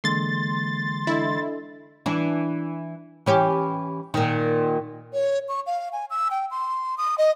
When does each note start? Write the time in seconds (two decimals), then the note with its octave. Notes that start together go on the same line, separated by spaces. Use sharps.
0.04 D3 E3 G#3 A#3 C6 A6
1.07 D4 E4 A4 D#5
2.06 E3 D4
3.26 E3 C#4 G4
4.14 A#2 D#3
5.13 C#5
5.49 C#6
5.67 F5
5.93 G#5
6.10 E6
6.31 G5
6.51 C6
6.98 D#6
7.18 D#5